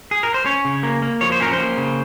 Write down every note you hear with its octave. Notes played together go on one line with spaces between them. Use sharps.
G#4
A#4
C5
C#4 C#5
C#3
A#3
A#3
F3 C#5
C5
C#4 A#4
C5
A#3
C#3